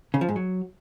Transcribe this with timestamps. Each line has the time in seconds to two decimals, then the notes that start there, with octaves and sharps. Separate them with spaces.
0.14 C#3
0.21 F3
0.29 G#2
0.36 F#3